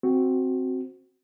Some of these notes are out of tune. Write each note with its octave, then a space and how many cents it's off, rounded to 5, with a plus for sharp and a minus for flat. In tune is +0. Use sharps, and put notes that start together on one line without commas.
C4 +0 F#4 +0